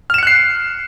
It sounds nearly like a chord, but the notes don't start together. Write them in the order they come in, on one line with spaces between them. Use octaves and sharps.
F6 E7 C#7 F#6 C7